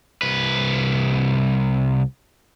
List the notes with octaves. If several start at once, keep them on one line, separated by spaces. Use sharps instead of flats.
C2 B4